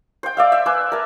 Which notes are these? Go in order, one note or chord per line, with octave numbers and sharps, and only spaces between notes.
C5 G5
D5 E5 F5
E5
B4 G#5 D6
A#4 A5